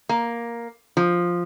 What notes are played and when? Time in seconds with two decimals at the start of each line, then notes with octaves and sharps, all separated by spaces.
0.09 A#3
0.97 F3